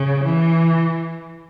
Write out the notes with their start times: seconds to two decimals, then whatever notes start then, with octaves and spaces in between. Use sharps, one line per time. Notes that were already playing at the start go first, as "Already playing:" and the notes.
Already playing: C#3
0.24 E3